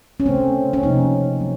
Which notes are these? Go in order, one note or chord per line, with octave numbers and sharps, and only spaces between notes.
C#4
C#3 A3 C4
C#4
C3 F3 A#3 D#4
F#3 A3